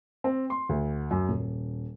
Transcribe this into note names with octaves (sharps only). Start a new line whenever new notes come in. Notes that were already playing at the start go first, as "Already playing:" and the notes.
C4
C6
D2
F#2
D#1